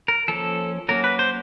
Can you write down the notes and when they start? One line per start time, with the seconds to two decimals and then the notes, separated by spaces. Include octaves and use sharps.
0.08 A#4
0.28 F3 A#3 C#4 A4
0.89 F#3 A#3 C#4 A#4
1.04 B4
1.19 C5